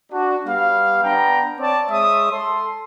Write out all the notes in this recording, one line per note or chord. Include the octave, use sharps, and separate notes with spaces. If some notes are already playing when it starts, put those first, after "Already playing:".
D4 F#4
G3 B3 F5
B3 D4 G5 A#5
C4 C#5 D5 A5
G#3 C#5 E5 D#6
A4 A5 C6